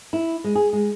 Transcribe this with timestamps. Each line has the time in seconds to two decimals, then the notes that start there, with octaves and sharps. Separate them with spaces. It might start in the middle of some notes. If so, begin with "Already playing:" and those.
0.13 E4
0.44 G#3
0.55 G#4
0.73 G#3